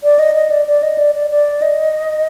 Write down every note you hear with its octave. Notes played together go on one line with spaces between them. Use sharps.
D5
D#5
D#5
D5
D5
D#5
D5
D5
D5
D#5